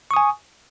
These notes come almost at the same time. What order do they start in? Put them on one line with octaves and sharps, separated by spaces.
C#6 D#6 G#5